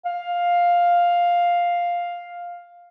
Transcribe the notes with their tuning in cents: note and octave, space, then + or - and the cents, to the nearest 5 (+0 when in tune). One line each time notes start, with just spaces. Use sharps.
F5 +5